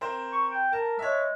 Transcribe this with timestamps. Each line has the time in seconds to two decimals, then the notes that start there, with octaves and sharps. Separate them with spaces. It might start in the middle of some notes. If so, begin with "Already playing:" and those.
0.01 C4 A#4 C5
0.32 C#6
0.50 G5
0.73 A#4 A5
0.99 G#3 C#5 E5